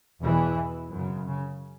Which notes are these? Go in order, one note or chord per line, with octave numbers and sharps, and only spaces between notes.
E2 B2 E3
F#2 C#3
C#3